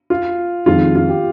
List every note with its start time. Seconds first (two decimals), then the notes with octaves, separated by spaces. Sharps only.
0.10 F4
0.66 F2 D#3 G#3 F4
0.95 F4
1.09 G4